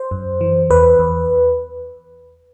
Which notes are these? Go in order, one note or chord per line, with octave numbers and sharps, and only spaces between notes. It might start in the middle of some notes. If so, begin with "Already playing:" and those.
Already playing: C5
F#2
E3
E2 B4
E2